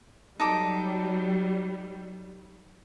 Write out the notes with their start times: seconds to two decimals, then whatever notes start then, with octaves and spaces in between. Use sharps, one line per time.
0.40 F#3 G3 D#4 A4 D6